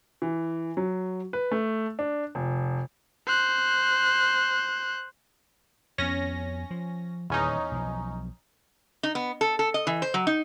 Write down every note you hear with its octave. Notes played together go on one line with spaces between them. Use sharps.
E3
F#3
B4
A3
D4
F1
C5 F#6
F2 B3 C#4 A#6
F3
D#1 E2 C#4 D#4
B1 F3
D#4
B3
A4
A4
D#5
E3
C5
F#3
D#4